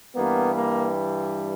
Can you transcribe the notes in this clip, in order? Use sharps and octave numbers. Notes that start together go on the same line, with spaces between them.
G2 E3 G3 A#3 B3
A#3